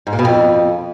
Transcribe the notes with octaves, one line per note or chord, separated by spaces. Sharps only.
G#2
A#2
B2
F2